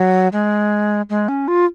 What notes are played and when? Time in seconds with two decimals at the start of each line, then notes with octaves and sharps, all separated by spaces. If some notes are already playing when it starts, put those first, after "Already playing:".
Already playing: F#3
0.32 G#3
1.10 G#3
1.28 C#4
1.48 F4